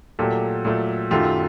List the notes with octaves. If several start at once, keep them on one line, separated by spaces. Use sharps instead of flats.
A#2 F#3 A3 G4 A4
A#2 F#3 A3
F#2 D#3 F#3 A3 F4 G4